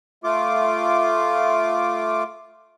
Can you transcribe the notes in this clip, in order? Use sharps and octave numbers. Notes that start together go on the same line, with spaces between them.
A3 F4 D6